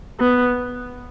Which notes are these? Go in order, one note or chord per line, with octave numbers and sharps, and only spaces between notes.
B3